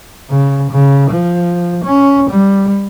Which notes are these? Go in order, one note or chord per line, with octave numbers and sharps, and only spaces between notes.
C#3
C#3
F3
C#4
G3